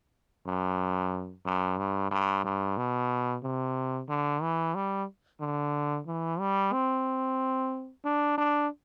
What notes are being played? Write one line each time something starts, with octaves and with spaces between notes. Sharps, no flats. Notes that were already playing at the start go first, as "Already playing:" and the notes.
F#2
F#2
G2
G2
G2
B2
C3
D3
E3
G3
D3
E3
G3
C4
D4
D4